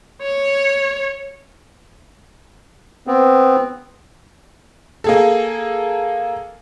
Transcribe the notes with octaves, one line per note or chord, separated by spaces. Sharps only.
C#5
B3 C4
A#3 G#4 A4